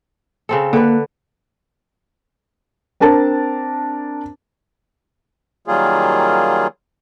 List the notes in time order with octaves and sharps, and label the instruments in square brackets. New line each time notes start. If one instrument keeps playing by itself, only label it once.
[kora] C#3 C4 A4
[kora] D3 B4 [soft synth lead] A#3
[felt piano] C4 D4 A#4 A5
[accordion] D#3 F#3 G3 A#3 F4 G#4